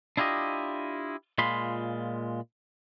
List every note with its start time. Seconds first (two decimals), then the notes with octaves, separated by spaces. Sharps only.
0.17 D4 E4 F4 G4 D#5
1.38 A#2 G#3 F4 B5 C6